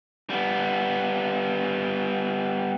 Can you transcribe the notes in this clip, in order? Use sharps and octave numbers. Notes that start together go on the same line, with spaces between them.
G3 B3